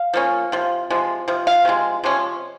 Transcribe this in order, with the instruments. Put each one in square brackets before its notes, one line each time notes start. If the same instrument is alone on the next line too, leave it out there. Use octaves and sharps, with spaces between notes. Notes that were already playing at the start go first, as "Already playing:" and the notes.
Already playing: [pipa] F5
F3 A#3 C#4
C3 F3
C3 F3 G#3
C3 F3
F5
C3 F3 G#3
C3 F3 G#3 C#4